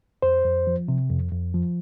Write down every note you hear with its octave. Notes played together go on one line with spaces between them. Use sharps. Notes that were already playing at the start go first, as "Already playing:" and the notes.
F2 C5
F2
F3
C3
F2
F2
F3